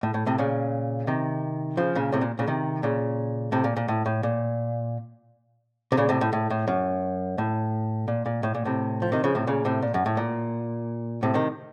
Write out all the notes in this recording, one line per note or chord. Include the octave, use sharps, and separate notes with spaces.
A2
A2
A2 C3
A#2 C#3
C3 D#3
C#3 F3
A#2 C#3
A2 C3
A#2
A#2 C#3
C3 D#3
A#2 C#3
A2 C3
A#2
A#2
A2
A2
A#2
C3
A#2 C#3
A2 C3
A2
A2
A2
F#2
A2
A#2
A#2
A2
A#2
A2 C3
F3
C3 D#3
C#3 F3
A2 C3
A#2 C#3
A2 C3
A#2
F#2
A2
A#2
A2 C3
C3 D#3